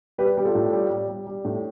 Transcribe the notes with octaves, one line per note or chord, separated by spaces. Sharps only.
G3 G4 B4
G3 G4
F4 A4
A2
G3
G3
G3
G3
A2